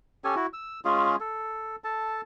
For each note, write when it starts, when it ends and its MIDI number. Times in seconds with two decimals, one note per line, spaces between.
0.24 0.35 61
0.24 0.35 67
0.24 0.35 69
0.24 0.35 80
0.36 0.46 64
0.36 0.46 66
0.53 0.80 88
0.85 1.16 56
0.85 1.16 61
0.85 1.16 65
0.85 1.16 68
1.20 1.76 69
1.84 2.21 69
1.84 2.21 81